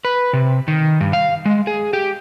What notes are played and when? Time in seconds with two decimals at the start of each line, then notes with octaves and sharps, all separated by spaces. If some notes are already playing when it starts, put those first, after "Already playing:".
0.05 B4
0.33 C3
0.68 D#3
1.00 G2
1.13 F5
1.46 G#3
1.67 G#4
1.93 G4